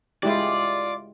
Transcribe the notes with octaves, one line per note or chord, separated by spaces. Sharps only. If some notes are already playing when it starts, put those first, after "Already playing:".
G#3 E4 F4 G4 D5